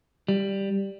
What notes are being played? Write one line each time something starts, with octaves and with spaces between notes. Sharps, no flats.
G3